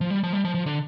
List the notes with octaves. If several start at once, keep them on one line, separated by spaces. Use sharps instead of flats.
F3
G3
F3
G3
F3
F3
D3